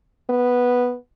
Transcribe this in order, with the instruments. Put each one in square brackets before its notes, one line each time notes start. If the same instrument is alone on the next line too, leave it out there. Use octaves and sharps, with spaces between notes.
[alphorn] B3